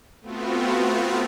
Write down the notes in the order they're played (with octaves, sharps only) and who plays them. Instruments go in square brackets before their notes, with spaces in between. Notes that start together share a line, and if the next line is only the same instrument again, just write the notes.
[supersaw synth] A3 B3 C4 F4 F#4